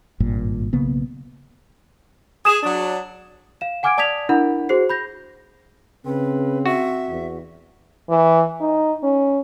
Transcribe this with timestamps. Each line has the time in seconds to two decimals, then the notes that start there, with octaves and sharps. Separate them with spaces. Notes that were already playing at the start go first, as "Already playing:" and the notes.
0.20 G#1 G2 A#2
0.73 B1 C#3 A#3 B3
2.45 G#4 D#6 E7
2.63 F#3 D4
3.61 F5 E7
3.83 F#5 G#5 D6 F6 G#6 D7
3.98 D5 A5 D#6 G#6 B6 F7
4.29 D4 E4 A#4 F#5 B5
4.69 F#4 G#4 C5 C7
4.90 B5 G6 A#6
6.05 C#3 C4 B4
6.66 F#4 E5
7.09 E2
8.09 E3
8.61 D#4
9.03 C#4